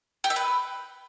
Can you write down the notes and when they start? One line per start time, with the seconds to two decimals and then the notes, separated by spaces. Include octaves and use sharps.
0.24 G4
0.30 E5
0.36 B4